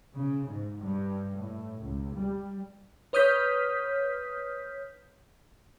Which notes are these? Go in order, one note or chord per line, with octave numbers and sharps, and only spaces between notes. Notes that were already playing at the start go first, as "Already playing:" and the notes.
C#3
G#2
G2
A2
C#2
G3
B4 C#5 D#6 F6 G6 B6